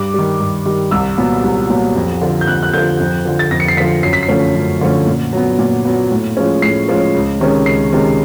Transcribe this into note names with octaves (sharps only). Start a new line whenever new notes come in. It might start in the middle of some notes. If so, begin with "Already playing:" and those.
Already playing: G2 D6
D#3 G3
G2
D#3 G3
C2 E6
A#2 F#3 B3
C2
A#2 F#3 B3
F2
D3 F3
G6
F2 F#6
F#6
D3 F3 G6
F2
D3 F3
A6
F2 A#6
C#7
C7
D3 F3 B6
F#2 C7
B6
C7
D3 F3 A3 C#4
F#2
D3 F3 A3 C#4
A#2
F#3 B3
A#2
F#3 B3
A2
F3 G#3 C#4
A2 C7
F3 G#3 C#4
C#2
C3 D#3 G#3 C#4
C#2 C7
C3 D#3 G#3 C#4